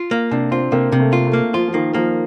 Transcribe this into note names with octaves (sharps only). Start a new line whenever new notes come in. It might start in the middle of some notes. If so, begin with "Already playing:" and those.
Already playing: F4
A#3
C3 D4
C4 F4
C3 A#3
C3
A3
F4
A3
A#3
F3 F4
F3
D#3 A#3
F3 A#3